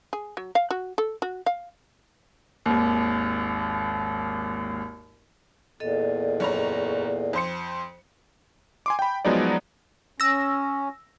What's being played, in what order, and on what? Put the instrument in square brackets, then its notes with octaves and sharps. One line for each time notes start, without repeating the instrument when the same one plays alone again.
[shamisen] G#4
F#3
F5
F#4
A4
F#4
F5
[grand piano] G#1 D#2
[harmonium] E2 A#2 [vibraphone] A4 D#5
[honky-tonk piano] F#1 C#5 A#5
F2 C5 C#7
[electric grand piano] G#5 C6 D6
G5 B5
F3 F#3 G#3 B3 D#4 D5
[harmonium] C#4 [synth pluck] E6 A#6